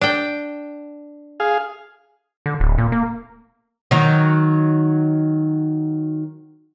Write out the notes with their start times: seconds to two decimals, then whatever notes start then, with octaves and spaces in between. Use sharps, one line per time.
0.01 D4 G5
1.40 G#4 F5
2.46 D3
2.60 D1
2.78 A#2
2.92 A#3
3.91 D#3 F#3